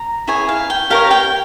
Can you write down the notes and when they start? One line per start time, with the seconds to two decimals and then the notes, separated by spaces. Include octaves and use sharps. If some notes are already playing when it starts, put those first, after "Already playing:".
Already playing: A#5
0.28 E4 G#4 C#5 G#5
0.49 F5
0.70 G5
0.90 G4 A#4 C#5 F5
1.11 G5